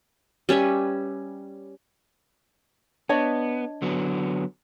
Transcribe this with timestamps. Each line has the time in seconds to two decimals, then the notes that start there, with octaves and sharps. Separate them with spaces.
0.49 G3 C#4 B4 E5
3.09 B3 D4 C#5 D#5
3.82 D3 F#3 B3